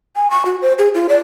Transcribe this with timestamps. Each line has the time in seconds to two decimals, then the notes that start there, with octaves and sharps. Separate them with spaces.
0.16 G#5
0.31 C#6
0.45 F#4
0.62 C5
0.79 G#4
0.95 F4
1.09 D5